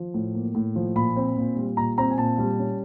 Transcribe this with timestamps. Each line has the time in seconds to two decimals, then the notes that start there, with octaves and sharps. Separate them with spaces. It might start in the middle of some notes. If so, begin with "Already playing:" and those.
Already playing: F3
0.14 A2
0.35 A#3
0.55 A2
0.75 F3
0.96 A#2 B5
1.16 C4
1.36 A#2
1.56 G3
1.77 A#2 A#5
1.98 C4 A#5
2.11 G#5
2.18 A#2 A5
2.38 G3
2.59 C#4